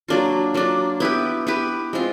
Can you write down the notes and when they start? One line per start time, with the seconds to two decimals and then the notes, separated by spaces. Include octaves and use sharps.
0.08 F#3 A#3 D4 F4
0.54 F#3 A#3 D4 F4
1.00 B3 E4 G4 B4
1.47 B3 E4 G4 B4
1.93 G#3 C4 F4